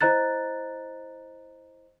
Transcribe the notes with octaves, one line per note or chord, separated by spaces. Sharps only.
E4 C5 D#5 A#5 F#6 A6